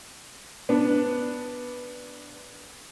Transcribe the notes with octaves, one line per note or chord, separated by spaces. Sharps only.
B3 D4